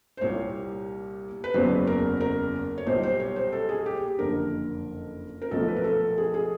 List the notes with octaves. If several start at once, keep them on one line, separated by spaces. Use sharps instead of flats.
C5
C2 A#2 G3 C#5
B4
F#1 E2 C#3 F#3 B3 C5
A#4
A#4
C#5
B1 A#2 G3 C5
C5
C#5
C5
A4
G#4
G4
F#1 F2 D3 A#4
A#4
B1 A#2 F3 A3 A4
B4
A#4
A4
G#4
G#4